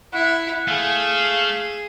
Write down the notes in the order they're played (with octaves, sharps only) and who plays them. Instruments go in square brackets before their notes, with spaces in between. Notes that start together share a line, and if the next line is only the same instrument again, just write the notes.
[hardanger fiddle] E4 [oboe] F#5
[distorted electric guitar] A3 [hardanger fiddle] G#4 [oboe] F5